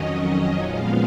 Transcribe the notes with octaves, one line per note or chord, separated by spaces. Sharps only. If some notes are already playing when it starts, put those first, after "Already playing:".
Already playing: F2 D#3 F#3 C#4 D#5
A#2 F3 G#3 B3 F5